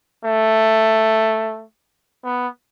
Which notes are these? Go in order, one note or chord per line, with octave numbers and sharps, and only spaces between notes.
A3
B3